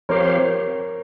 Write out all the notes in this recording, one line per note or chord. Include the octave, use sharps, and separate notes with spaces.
F3 C4 G4 A#4 C5 C#5 F5